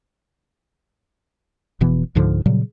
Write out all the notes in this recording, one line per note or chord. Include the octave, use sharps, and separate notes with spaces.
F1 B2 E3 B3
C#2 G#2 D3 F3
A#2 C#3 F#3 G3